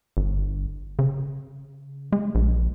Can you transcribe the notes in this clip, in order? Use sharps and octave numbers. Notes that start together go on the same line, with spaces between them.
G1
C#3
G#3
A#1